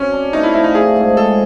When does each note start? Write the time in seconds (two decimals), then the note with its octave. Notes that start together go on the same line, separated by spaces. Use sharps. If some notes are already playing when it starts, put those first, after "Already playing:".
Already playing: C4 C#4 F#4
0.13 D4
0.33 A3 D#4
0.43 E4
0.54 F3 E4
0.64 D#4
0.74 A3 G#4
0.96 G#2
1.17 G#2 A4